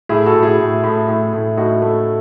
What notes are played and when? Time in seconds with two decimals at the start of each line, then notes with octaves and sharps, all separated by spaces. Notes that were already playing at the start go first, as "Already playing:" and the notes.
0.09 A2 E4 G#4
0.26 F#4 A4
0.34 A2
0.42 E4 G#4
0.59 A2
0.83 A2
1.08 A2
1.33 A2
1.57 A2 D#4 F#4
1.82 A3